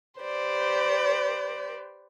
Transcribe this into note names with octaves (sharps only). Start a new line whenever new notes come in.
G4 B4 C5 D5